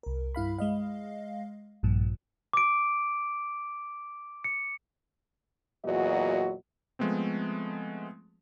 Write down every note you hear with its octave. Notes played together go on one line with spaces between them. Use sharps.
C2 A#4
G2 E4 F5 B5
G#3 D#5 F5
A#1 G2 A#2 F3
D6 D7
C#7
E2 A#2 F#3 F#4 D#5
F3 G#3 A3 B3 C4